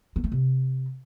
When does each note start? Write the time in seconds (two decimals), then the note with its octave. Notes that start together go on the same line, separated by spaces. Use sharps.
0.16 A#3
0.24 A3
0.32 C3